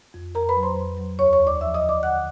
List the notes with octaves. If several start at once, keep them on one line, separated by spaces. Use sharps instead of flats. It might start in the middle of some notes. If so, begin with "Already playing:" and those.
F2
F2 A#4 A#5
B4 B5
F#3
C5 C6
F2
F#3
D#2 C#5 C#6
C#5 C#6
D#2
D5 D6
F3 E5 E6
D#5 D#6
D3
D5 D6
D3 F#5 F#6